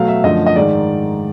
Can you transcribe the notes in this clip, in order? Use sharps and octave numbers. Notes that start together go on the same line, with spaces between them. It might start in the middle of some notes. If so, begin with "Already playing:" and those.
Already playing: B2 F#3 A3 F5
E5
F#2 D3 F3 A3 D#5
D#5
G#2 D#3 G#3 D5